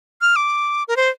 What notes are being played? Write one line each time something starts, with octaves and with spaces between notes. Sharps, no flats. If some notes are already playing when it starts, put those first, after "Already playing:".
F6
D6
A#4
C5